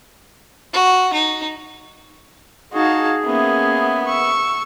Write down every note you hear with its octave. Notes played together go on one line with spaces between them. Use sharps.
F#4
D#4
D#4 F#4 G#4 F5 A5
A#3 B3 C#4 E5
C#6 E6